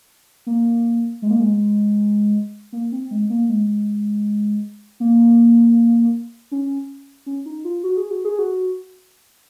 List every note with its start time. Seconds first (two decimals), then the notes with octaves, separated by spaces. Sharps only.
0.46 A#3
1.22 G#3
1.30 A#3
1.40 G#3
2.73 A#3
2.92 C4
3.11 G#3
3.30 A#3
3.49 G#3
5.00 A#3
6.52 C#4
7.26 C#4
7.46 D#4
7.65 F4
7.83 F#4
7.97 G#4
8.11 F#4
8.25 G#4
8.39 F#4